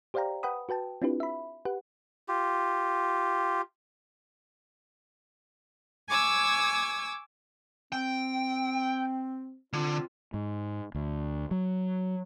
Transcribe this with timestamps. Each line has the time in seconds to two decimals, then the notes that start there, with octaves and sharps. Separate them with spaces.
0.14 G4 C5 D5 F5 G5 A#5
0.43 B4 F#5 G5 B5 D#6
0.69 F#4 B4 G5 A5
1.02 C4 D4 E4 F4 G4 B4
1.20 E5 B5
1.65 G4 B4 F#5
2.28 F4 G4
6.09 G#5 C#6 D6 E6 G#6
7.92 C4 G5
9.73 D3 C4 F4
10.34 G#2
10.95 D2
11.51 F#3